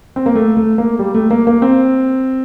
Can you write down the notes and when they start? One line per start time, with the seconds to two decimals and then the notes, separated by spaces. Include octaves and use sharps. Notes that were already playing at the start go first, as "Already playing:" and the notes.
0.16 C4
0.26 A#3
0.35 A3
0.57 A3
0.78 A#3
0.99 G3
1.15 A3
1.31 A#3
1.47 A#3
1.62 C4